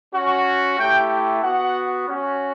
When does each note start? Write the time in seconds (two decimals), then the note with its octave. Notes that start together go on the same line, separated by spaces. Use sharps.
0.14 C#4 F#4
0.78 A3 E4 G4 G5
1.42 B3 F#4 F#5
2.07 C#4 F#4